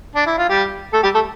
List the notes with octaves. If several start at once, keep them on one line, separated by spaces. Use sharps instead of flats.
D4
E4
F4
G3 G4
A3 A4
G3 G4
A3 A4